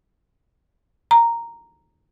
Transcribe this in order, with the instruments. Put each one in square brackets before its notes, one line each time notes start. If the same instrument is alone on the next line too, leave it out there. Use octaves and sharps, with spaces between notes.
[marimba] A#5